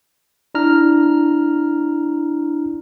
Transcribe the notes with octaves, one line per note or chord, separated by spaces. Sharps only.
D4 E4 A#5 F6